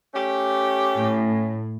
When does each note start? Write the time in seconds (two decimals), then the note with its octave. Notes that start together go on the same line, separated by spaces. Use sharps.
0.14 A3 C#4 G4
0.99 A2